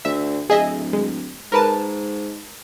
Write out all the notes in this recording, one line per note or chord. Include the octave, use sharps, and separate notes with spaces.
D2 E5
D1 G#4 D#5 E5
G#3
G#2 A#4 B4 A5